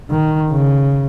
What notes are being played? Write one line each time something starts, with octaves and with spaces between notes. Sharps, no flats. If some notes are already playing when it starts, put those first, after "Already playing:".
D#3
C#3